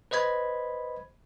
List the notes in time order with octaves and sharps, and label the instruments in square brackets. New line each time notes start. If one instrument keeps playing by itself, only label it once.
[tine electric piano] B4 C5 D#5 B5 G#6